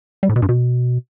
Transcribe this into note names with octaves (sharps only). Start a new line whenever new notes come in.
G3
A2
B2
G2
B2